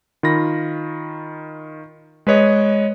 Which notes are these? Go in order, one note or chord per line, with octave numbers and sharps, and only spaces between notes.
D#3 F4 B5 A#6
G#3 B4 C#5 D#5